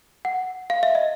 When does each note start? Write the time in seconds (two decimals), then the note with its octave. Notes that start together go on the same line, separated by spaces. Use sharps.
0.25 F#5
0.70 F5
0.83 E5
0.95 D#5